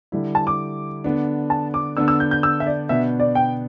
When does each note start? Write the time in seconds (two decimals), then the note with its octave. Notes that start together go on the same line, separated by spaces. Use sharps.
0.12 D3 G3 E4
0.35 A5
0.47 D6
1.04 D3 B3 D4
1.50 A5
1.74 D6
1.97 D3 B3 D4 E6
2.08 E6
2.20 G6
2.31 G6
2.43 E6
2.60 E5
2.67 D5
2.89 B2 B3 D4 E5
3.20 D5
3.35 G5